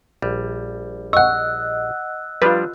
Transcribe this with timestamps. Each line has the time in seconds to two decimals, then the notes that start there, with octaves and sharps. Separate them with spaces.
0.22 A#1 G3
1.13 D#5 F#5 C#6 E6 F#6
2.42 F3 G3 D4 F4 B4